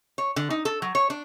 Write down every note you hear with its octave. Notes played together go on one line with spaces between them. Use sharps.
C#5
D3
D#4
A4
F#3
C#5
D4